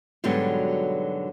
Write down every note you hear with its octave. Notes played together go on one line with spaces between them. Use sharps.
G#2 B2 D3 F#3 G3